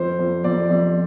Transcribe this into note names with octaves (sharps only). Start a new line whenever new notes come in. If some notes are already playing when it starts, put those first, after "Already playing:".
Already playing: F2 C5
F2
F2 D5
F2